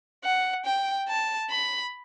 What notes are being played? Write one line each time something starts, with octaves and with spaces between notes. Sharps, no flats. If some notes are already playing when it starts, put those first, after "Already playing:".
F#5
G5
A5
B5